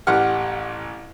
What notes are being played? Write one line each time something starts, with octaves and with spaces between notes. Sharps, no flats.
A1 G4 F#5 F6